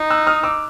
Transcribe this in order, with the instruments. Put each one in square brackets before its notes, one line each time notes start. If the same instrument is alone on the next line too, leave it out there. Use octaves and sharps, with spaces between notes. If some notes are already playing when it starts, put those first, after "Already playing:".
Already playing: [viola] D#4
[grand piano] E6 F#6
D#6 F6
D6 E6